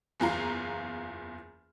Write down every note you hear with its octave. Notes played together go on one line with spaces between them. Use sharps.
F#1 E2 F4 A#5